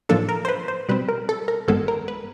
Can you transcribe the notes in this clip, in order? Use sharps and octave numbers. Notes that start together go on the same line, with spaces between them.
A2 F3 A#3 D4 A4
A#4
C5
B4
C5
B2 G3 C4 B4
A#4
A4
A#4
A1 G2 D#3 G#3 B3 A4
A#4
B4